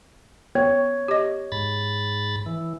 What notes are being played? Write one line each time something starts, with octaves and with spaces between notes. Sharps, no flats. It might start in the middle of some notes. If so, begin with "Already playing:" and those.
B3 C#5
G4 D#5
G#2 B5 A6
E3